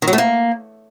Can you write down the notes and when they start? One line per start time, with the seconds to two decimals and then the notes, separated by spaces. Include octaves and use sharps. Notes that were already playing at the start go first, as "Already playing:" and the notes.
0.02 D#3
0.08 F#3
0.13 A3
0.18 A#3